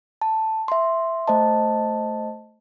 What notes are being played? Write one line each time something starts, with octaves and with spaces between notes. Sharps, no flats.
A5
E5 C6
A3 C5 D#5 A5